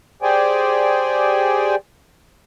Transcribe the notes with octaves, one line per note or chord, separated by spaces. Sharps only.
G4 G#4 C5 D5 G5 G#5